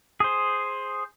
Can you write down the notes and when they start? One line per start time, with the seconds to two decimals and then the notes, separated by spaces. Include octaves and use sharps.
0.20 G#4 C5